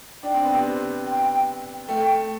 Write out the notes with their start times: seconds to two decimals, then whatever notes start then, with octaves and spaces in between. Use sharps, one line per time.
0.23 D4 G5
0.34 C4
0.44 B3
0.54 C3 C4
1.05 G5
1.88 A3 G5